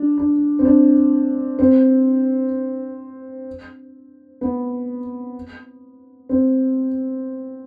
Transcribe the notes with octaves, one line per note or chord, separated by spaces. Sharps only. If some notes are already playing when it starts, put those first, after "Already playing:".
Already playing: D4
D4
C4
D4
C4
B3
C4